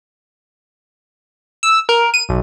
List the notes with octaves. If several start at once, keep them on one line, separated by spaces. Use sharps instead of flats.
E6
A#4
D#7
B1